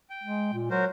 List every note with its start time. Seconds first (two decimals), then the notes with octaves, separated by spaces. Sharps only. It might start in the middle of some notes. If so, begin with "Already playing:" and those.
0.10 G5
0.23 G#3
0.53 A#2
0.70 F#3 F#4 A#4 C5